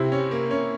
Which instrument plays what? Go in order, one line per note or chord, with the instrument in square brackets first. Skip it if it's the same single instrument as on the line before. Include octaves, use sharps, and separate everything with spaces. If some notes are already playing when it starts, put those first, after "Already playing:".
Already playing: [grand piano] C3 [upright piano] C4 E4
[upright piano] C#4
A#3
C#4